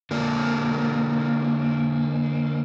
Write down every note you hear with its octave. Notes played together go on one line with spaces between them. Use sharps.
D3 A#3 D4